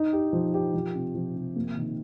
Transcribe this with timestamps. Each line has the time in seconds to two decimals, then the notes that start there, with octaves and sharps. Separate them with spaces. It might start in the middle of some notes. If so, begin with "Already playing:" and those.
Already playing: D#4
0.13 G4
0.33 F3
0.54 G4
0.74 F3
0.95 C3
1.15 F3
1.36 C3
1.56 A#3
1.77 D#3